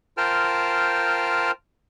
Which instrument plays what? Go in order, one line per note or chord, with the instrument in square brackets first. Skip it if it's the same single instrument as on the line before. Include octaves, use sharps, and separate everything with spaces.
[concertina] F4 A#4 C5 G5 A5 F6